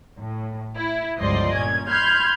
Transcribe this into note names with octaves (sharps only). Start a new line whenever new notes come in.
A2
E4
G1 C#2 F3 D5 D#5 C6
A#2 C#4 G#6
B5 C6 F6 G6 G#6